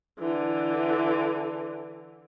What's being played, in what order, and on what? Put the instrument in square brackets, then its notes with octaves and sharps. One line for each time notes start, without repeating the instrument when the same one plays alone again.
[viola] D3 E3